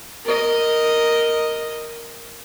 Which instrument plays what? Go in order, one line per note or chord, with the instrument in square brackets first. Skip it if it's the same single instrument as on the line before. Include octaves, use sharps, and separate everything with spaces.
[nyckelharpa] A#4 D#5